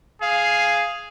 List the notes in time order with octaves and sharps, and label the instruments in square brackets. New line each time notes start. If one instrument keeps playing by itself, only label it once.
[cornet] G#4 [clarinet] F5